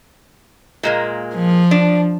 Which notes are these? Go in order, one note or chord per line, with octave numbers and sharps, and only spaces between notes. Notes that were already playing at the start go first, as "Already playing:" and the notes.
A#2 G#3 A#3
F3
D4